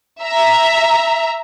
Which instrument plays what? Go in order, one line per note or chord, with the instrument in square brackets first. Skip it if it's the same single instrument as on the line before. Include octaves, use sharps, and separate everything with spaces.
[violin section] E5 A#5